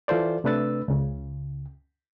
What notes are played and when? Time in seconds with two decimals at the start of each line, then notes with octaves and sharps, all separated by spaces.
0.08 E3 F4 A4 C5 D5
0.44 C3 A3 D4 B4 E6 A6
0.88 C#2 C#3